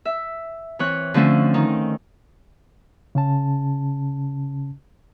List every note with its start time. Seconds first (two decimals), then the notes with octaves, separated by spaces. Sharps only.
0.05 E5
0.79 E3 C4 C#5 F#6
1.14 D3 F3 A3 C4 C#4
1.54 D#3 D#4
3.15 C#3 C#4 A5